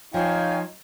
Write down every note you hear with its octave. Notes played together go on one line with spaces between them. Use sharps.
F3 D#4 C#5 F5 G5 G#5